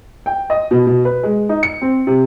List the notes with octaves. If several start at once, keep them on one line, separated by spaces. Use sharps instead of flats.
G5
D#5
B2
B2
B4
G#3
D#4
C#7
C4
C3